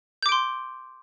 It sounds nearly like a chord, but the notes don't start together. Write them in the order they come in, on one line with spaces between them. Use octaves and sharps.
G6 D6 D7 C6